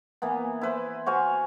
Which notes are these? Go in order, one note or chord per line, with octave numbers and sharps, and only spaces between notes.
E3 A#3 B3
E4 B4 C5
F#4 C5 F5 G#5